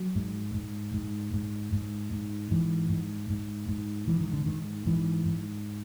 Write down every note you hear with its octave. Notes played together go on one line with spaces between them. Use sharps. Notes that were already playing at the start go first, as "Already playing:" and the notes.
Already playing: F#3
G#2
G#2
G#2
G#2
G#2
G#2
G#2 E3
G#2
G#2
G#2
G#2 E3
D#3
D3
G#2 D#3
G#2 E3
G#2